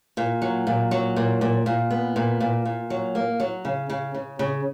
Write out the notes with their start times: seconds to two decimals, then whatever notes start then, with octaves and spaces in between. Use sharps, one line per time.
0.17 A#2
0.42 F#3
0.67 A#2
0.91 F#3
1.16 A#2
1.41 A#2
1.66 A#2
1.90 B3
2.16 A#2
2.40 A#2
2.65 A#2
2.90 F#3
3.15 A#3
3.40 F#3
3.65 C#3
3.90 C#3
4.14 C#3
4.39 C#3